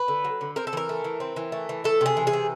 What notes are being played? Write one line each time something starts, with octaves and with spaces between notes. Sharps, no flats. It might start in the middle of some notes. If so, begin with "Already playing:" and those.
Already playing: B4
D3
F#3
D3
C4 A#4
A4
E3 A#4
A3
E3
C4
E3
A3
E3
A3 A4
C3 G#4
E3
G#4
C3